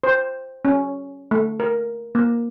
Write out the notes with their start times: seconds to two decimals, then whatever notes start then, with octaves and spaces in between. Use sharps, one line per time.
0.04 C5
0.65 C#4
1.31 A3
1.60 A#4
2.15 A#3